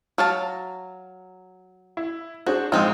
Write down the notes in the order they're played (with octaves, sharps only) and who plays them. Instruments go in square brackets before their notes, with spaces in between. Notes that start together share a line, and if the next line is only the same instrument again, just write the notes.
[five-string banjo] F#3 F5 A5
[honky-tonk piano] E4
[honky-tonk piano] D4 G#4 C5 [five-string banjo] F#4
[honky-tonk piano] A#1 G#2 D#4 [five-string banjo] G#3 C4 F4